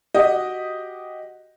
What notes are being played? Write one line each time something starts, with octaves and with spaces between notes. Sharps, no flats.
F#4 G4 D#5